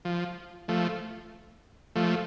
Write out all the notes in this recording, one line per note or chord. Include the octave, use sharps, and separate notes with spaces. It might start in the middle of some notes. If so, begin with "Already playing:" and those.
F3
F3 A3
F3 A3